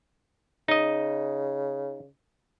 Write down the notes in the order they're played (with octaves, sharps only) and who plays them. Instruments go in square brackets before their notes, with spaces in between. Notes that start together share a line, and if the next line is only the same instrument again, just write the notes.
[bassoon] C#3 [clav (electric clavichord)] D#4 D#5